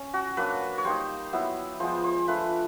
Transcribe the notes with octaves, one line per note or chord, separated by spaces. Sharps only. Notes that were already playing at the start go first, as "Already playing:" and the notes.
Already playing: C#4
F#4
F#3 A#3 D4 B4
C#5
G3 A#3 D#4 C5
F#3 B3 E4
F3 G#3 B3 C5
C5
A3 D4 F4 B4
B4